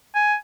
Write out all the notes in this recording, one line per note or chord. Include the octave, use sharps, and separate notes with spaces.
G#5